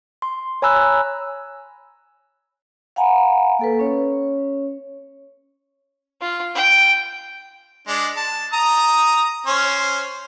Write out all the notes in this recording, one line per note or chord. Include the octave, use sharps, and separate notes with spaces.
C6
C#5 G#5 A#5 B5 E6 F#6
F5 F#5 G#5 A#5 B5
A#3 A4 B4
C#4 C#5
F4
G5
G#3 D4
A5
A#5 D#6
C#4 C5